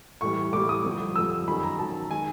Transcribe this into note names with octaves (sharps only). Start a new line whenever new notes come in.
A2 E3 G3 C#6
A2 E3 G3 D6
D#6
F2 D3 G3
F2 D3 G3 E6
F#2 D#3 F#3 B5
A#5
F#2 D#3 F#3 A5
D#3 G#3 G#5